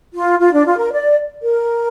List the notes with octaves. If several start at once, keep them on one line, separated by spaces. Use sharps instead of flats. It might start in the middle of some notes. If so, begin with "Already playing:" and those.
F4
F4
D4
F4
A#4
D5
A#4